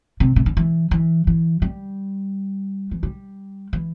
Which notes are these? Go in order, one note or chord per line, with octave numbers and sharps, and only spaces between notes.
C3
C3
D3
E3
E3
E3
G3
E3
G3
E3